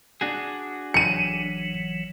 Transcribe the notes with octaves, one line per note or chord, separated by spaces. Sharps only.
D4 F#4 G#4
F#1 E3 F#3 C#7 D#7